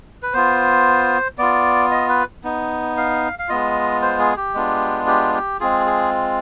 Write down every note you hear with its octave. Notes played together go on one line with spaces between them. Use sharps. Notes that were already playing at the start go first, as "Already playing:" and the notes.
B4
B3 F4 C5
B3 F4 D5
D#5
B4
B3 D#4
F5
F5
G#3 B3 F4 D#5
C5
G#4
G4
G#3 B3 D4 F4
G4
G4
G#3 C4 F4 G#4
G#4